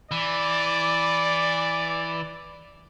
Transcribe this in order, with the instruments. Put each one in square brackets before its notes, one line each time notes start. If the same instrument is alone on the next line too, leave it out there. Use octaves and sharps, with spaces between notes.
[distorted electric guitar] E3 [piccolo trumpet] D5